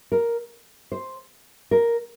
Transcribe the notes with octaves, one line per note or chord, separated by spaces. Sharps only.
A#4
C5
A#4